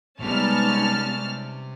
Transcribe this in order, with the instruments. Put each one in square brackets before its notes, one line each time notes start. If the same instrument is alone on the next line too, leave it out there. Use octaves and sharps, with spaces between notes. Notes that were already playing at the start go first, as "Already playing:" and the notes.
[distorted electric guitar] C3 [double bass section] G3 [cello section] G#3 B3 D#4 [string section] C#4 A5 F6